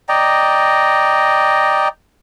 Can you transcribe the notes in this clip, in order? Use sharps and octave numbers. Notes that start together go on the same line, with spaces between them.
D5 D#5 G5 A#5